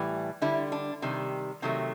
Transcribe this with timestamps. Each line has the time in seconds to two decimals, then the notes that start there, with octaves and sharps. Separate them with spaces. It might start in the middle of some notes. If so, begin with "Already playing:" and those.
Already playing: A2 E3 G3
0.42 D3 G3 E4
0.72 D4
1.02 C3 D#3 G3
1.62 C3 D#3 F#3 A3